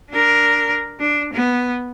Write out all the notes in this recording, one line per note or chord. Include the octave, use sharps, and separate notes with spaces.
D4 A#4
D4
B3